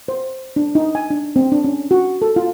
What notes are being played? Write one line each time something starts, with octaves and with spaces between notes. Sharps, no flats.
C5
D4
D#4
G#5
D4
C4
D4
C#4
F#4
A4
F4